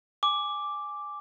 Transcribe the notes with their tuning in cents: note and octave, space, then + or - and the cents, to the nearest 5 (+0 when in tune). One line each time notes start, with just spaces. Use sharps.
G#5 +0 D6 +0